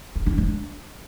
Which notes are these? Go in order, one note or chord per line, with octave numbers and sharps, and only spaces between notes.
C#4
D4
D4